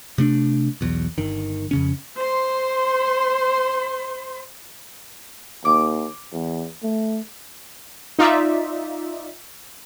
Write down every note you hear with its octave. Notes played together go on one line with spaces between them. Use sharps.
C3 A3 D4
B1 E2
G1 D#3
F2 C#3 C#4
C5 C6
D#2 D6
E2
A3
D#4 F4 D5 E5